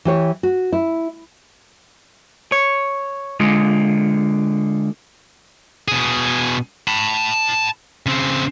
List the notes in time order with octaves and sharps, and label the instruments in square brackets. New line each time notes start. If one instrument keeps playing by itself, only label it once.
[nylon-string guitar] E3 G4 C#5
F#4
E4
[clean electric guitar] C#5
D3 G#3 F4
[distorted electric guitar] B2 G#4
A5 B5
C#3 C4